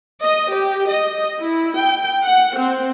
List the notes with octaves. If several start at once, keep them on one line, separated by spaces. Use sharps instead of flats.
D#5
G4
D#5
E4
G5
F#5
C4